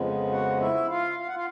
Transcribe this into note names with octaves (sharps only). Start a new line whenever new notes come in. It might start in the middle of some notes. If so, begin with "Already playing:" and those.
Already playing: F2 C#3 F3 G#3 B3
F#4 F#5
E4 E5
F4 F5
F5
F#5
F4 F5